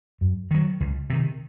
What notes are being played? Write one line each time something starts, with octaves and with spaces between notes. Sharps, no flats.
F#2
D#3 F#3
C#2
C3 D#3